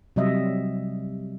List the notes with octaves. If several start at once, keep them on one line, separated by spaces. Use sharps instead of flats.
C3 F#3 G3 D#5 E5